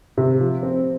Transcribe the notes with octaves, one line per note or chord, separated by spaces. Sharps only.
C3
F3
C4